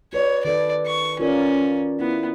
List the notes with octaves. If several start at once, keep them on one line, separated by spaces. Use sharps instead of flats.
F#4 B4 C#5 D5
D#3 A4 B4 D5
C#6
C#4 F4 A#4 D5
B3 E4